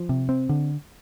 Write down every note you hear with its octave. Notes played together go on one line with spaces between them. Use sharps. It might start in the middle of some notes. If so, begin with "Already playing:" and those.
Already playing: F3
C3
C4
D3